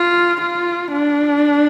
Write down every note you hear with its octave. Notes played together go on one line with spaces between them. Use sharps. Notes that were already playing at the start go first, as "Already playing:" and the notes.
Already playing: F4
F4
D4